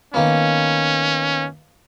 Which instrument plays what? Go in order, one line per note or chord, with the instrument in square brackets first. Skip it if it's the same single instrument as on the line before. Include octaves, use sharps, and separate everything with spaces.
[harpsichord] D#3 A#3 B3 [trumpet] C#4